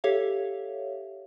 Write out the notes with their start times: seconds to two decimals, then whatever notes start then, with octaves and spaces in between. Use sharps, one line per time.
0.04 G4 A4 C#5 E5 F5